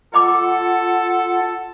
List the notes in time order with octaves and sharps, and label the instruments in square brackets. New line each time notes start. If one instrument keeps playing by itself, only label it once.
[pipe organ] F4 F#5 [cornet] A4 [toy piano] D#5 B5 D6